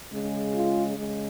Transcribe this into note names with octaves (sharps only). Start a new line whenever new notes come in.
C#3 G#3
F4
C#3 G#3